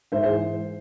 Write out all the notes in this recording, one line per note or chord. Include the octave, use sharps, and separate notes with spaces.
G#2 C5 E5
E3 G#4 C5